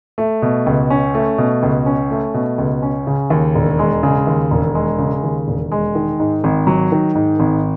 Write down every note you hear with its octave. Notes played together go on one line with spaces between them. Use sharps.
A3
B2
C#2
C#4
A3
B2
C#2
C#4
A3
B2
C#2
C#4
C#3
D#2
E1
G#3
C#3
D#2
E1
G#3
C#3
D#2
E1
G#3
D#3
G#2
G#1
F#3
D#3
G#2
G#1